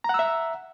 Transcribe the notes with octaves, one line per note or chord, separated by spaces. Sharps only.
E5 F#5 A#5 E6